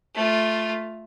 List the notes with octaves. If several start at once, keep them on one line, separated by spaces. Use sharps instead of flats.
A3 F4